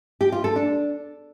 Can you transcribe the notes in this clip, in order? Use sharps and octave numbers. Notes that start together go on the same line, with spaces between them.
G4
F4
A4
D4